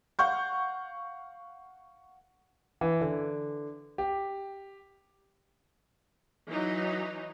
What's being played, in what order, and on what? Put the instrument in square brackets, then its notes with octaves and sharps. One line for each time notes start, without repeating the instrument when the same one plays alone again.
[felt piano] F5 F#5 C#6 G6
[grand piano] E3
D3
G4
[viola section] E3 F#3 D#4